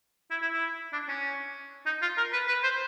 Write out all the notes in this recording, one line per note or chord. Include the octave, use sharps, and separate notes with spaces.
E4
E4
E4
D4
C#4
D#4
F4
A#4
B4
B4
C5